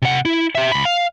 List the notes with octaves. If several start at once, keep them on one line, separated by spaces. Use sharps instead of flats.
C3 F#5
E4
G4 E5
C#2 B5
F5